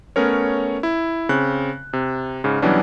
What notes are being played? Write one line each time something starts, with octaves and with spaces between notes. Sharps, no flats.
A3 B3 C#4 A#4 C#5
E4
C#3 C4 F#6
C3
G#2 C#3
B2 E3 F#3 G3 C#4 D4